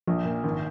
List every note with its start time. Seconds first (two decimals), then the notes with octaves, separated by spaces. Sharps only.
0.07 A#1 F3
0.25 A#2
0.44 G#1